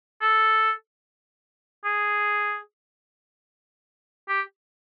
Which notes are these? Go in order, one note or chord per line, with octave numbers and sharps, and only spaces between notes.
A4
G#4
G4